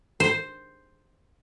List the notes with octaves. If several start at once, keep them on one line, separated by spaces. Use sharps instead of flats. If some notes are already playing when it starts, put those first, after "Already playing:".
C5